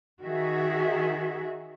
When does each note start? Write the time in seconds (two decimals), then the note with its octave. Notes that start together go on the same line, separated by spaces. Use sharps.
0.21 D#3 F#4 G#4 E5